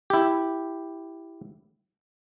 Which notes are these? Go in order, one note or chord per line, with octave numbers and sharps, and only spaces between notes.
E4 G4